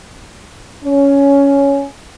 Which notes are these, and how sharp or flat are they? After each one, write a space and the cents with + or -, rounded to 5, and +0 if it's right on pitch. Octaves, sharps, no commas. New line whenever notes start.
C#4 +10